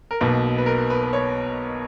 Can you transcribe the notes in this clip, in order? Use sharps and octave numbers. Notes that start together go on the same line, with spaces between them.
A#4
B1 B2 A#3 B4
B4
A#4
B4
B4
C#5